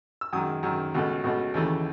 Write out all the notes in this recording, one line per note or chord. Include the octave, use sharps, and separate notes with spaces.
E6
F#2 D#3 G#3 D#6
F#2 D#3 G#3
C#2 B2 A3
C#2 B2 A3
D#2 C#3 E3 A3